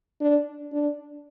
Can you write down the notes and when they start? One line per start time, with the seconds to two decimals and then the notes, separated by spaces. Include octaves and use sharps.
0.20 D4
0.72 D4